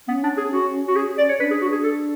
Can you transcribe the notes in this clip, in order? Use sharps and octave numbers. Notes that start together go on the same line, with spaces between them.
B3 C#4
D4
G#4
F#4
F#4
G#4
D5
C#5
D4 B4
G#4
D4 F#4
G#4
A4